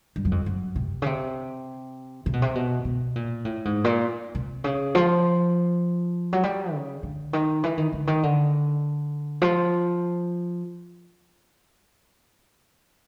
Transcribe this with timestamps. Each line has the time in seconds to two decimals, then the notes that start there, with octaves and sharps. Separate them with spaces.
0.16 G2
0.25 F#2
0.31 F2
0.46 F#2
0.76 C3
1.02 C#3
1.06 C3
2.26 C3
2.33 B2
2.42 C3
2.55 B2
2.85 B2
3.16 A#2
3.45 A2
3.65 G#2
3.84 A#2
4.35 C3
4.64 C#3
4.95 F3
6.33 F#3
6.43 G3
6.73 C#3
7.03 D3
7.33 D#3
7.64 E3
7.78 D#3
7.93 D3
8.07 D#3
8.23 D3
9.42 F3